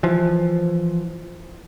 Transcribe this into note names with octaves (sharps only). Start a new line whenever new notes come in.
E3 F3